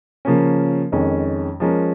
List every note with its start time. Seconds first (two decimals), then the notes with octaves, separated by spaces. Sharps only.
0.25 C#3 F3 A#3 C#4
0.92 F2 D#3 G#3 C#4
1.60 F3 G#3 C#4 A#4